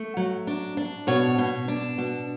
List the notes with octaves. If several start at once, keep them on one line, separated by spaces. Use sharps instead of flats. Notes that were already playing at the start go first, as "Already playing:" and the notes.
Already playing: A3
F#3
D4
D4
B2 C#5
B2
D4
B2